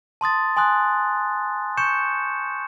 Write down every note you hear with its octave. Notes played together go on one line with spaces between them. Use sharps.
A5 C6 D#6 A6
G#5 C6 D#6 F#6
C#6 G6 C#7 E7